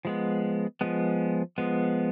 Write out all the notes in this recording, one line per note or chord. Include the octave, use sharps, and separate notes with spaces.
F3 G#3 B3
F3 G#3 B3
F3 G#3 B3